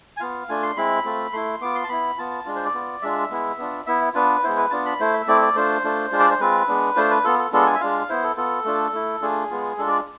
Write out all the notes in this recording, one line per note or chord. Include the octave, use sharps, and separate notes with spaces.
G#5
B3 F4 F5
A3 D4 F4 G#5
C6
G#3 C4 E4 B5
A3 C4 F4
A3 E4 C6
B3 F4 D6
C6
A5
B3 E4 B5
B3 F4 A5
G#3 D4 F4
C5
D5
B3 F4
G#3 D4 F4 E5
G#3 B3 E4
B3 D4 F4
B3 E4 E5
B3 D4 F4 B4
G#3 B3 E4 C5
B4
B3 D4 F4 A5
B5
A3 E4 C5
E5
A3 C4 E4 D5
D5
A3 D4 F4 C5
A3 D4 F4
G#3 D4 F4
D5
C5
G#3 C4 F4 B4
G#3 B3 D4
A3 D4 F4 C5
B4
B3 F4 A4
A4
G#3 B3 D4 F4 A4
G#5
E5
G#3 D4 F4 F5
B3 E4 C5
A4
B3 F4 A4
A3 D4 F4
A3 E4
A3 D4 F4 G#4
G#3 B3 F4
G#3 D4 F4 A4
D5